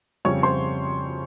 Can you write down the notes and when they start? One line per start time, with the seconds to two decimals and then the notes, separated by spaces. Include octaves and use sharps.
0.25 F2 C#3 G3 C4 C#5 C#6
0.43 C5 C6